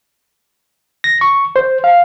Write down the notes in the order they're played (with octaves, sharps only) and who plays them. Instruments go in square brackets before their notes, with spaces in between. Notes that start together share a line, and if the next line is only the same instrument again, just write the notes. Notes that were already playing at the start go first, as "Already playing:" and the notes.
[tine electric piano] A#6
C#6
C5
F5